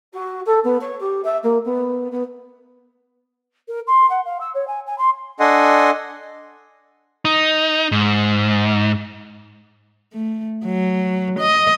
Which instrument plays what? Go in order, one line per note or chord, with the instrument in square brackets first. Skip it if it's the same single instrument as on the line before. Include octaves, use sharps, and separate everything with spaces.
[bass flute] F#4
A4
B3
C#5
G4
E5
A#3
B3
B3
[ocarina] A#4
C6
F#5
F5
E6
C#5
G#5
G#5
C6
[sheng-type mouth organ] D4 A4 D#5 F#5 G#5 C6
[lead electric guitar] D#4
G#2
[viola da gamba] A3
F#3
D#5